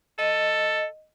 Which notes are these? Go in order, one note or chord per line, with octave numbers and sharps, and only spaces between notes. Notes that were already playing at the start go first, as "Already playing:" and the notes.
A4 D#5